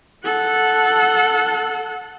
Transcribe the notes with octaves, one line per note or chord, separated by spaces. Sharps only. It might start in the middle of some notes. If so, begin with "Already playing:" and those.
A4 F#5